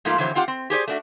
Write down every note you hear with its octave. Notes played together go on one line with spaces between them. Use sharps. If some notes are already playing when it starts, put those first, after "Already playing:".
G#2 F3 A3 A#3 F4
F2 D3 E3 F#3 C5
C4 F4 G4 F#5
C4
G4 G#4 C5 D5
A3 D4 F#4